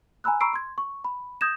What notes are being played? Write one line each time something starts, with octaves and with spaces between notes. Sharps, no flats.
G#5 A#5 B5 E6 F#6
A#5 B5 C#6 E6 C7 D7
C6 G#6
C#6
B5
D#6 G6 G#6 A#6 E7